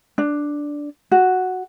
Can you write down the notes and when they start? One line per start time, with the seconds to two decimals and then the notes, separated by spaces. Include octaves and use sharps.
0.18 D4
1.11 F#4